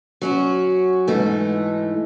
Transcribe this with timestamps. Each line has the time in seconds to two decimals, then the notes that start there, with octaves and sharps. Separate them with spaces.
0.21 F#3 C#4 F#4
1.08 G#2 E3 A3 D#4